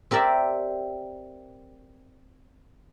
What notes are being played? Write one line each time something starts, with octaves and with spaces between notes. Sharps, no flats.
C4 G4 A#4 D5 E5